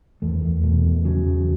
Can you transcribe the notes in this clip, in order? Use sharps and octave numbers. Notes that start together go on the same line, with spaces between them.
E2 A3
E2
B2 A3
E2
C#3 F#3
E2